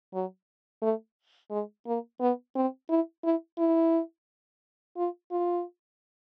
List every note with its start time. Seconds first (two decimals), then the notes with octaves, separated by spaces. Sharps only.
0.14 F#3
0.82 A3
1.51 G#3
1.87 A#3
2.21 B3
2.56 C4
2.90 E4
3.24 E4
3.59 E4
4.97 F4
5.32 F4